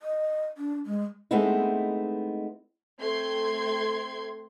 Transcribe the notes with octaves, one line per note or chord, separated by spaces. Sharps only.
D#5
D4
G#3
G#3 A3 B3 C4 D#4 E4
A3 C4 G5 C6 G#6